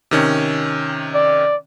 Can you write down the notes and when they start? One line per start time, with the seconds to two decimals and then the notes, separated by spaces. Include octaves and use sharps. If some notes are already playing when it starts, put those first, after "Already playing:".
0.11 C3 D#3 C#4
1.14 D5